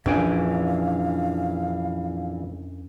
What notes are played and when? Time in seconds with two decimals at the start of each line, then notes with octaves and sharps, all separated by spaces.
0.06 A#1 F2 E3 C#4 D4 F5 G5 G#5